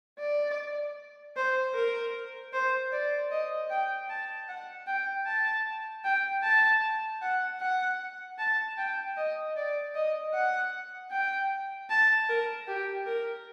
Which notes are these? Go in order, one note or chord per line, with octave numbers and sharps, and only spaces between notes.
D5
C5
A#4
C5
D5
D#5
G5
A5
F#5
G5
A5
G5
A5
F#5
F#5
A5
G5
D#5
D5
D#5
F#5
G5
A5
A#4
G4
A#4